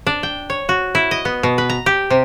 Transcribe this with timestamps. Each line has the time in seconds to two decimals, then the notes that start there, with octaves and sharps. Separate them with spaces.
0.07 D4
0.23 G5
0.50 C#5
0.69 F#4
0.95 E4
1.11 D#5
1.25 B3
1.43 B2
1.58 B4
1.70 A#5
1.86 G4
2.10 C3